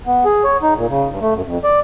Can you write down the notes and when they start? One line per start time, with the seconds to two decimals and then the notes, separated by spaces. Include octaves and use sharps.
0.07 B3
0.25 G#4
0.44 C#5
0.62 D#4
0.77 A#2
0.89 C#3
1.09 G2
1.21 A3
1.34 F#2
1.46 F2
1.64 D5